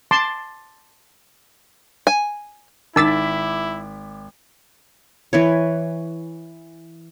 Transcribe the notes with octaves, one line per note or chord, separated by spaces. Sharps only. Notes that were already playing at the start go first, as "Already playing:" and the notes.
A5 C6 D6
G#5
G#1 D#3 D#4 E4 D6 E6 A6 B6
E3 B4 C#5